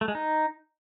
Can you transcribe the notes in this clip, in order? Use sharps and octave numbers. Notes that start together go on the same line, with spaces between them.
A3
G#3
D#4